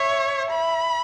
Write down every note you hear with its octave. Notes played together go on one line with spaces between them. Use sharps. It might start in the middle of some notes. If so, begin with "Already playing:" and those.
Already playing: C#5 E5
B5